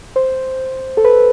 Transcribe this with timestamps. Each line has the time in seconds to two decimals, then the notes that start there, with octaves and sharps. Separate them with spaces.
0.16 C5
0.97 A4
1.04 B4